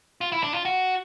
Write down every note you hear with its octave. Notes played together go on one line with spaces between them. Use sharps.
F4
E4
D4
F4
F#4